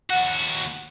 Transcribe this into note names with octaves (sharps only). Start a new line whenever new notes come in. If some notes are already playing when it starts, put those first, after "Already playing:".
D#2 F#4 F#5